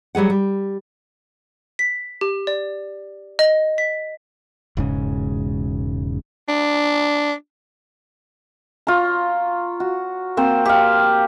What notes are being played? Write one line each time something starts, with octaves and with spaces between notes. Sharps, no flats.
F#3 G3 G#4 F#5
G3
B6
G4
D5
D#5
B6
E1 G#2 C#3
D4
F4 C#5 A#5
F#4
A#3 C4 C5
G4 F5